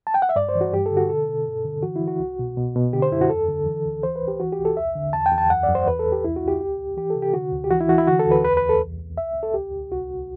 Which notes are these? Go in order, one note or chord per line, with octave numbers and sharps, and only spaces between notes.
A5
G5
F#5
E5
G2 D5
C5
E3
F#4
G2 G4
A4
D3
F#4
B2 A4
B2
G2
D3
E3 F#4
E4
E3
F#4
C2
B2
B2
B2
D3 G4
C5
F#2 E4
F#4
E2 A4
D3
E3
D2
E3 C5
B4
C2
G4
E3 F#4
G4
C2
A4
E2 E5
D3
E2 A5
G5
E2
A5
F#2 F#5
D5
F#2
C5
E2 B4
A4
E2
G4
C2 E4
F#4
C2
G4
D2
D2
E3 G4
A4
C3
G4
D3 F#4
D2
G4
E3 F#4
E4
E3 F#4
E4
D3 F#4
A4
D2
B4
E2 B4
B4
E2
A4
C2
C2
C2 E5
C2
A4
D2 G4
D2
C2 F#4
C2